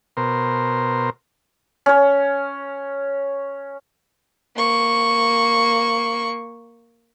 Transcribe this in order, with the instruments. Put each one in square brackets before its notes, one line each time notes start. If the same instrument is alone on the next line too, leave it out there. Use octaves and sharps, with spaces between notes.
[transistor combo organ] B2 A#4 C5
[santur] C#4 C#5
[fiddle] A#3 C#6